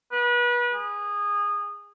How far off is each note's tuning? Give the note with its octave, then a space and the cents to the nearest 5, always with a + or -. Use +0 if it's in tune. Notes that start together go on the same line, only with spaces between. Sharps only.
B4 -30
G#4 -20